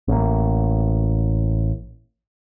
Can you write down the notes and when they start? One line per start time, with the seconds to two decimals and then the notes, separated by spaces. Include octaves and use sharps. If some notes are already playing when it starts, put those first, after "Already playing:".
0.08 A1 A#3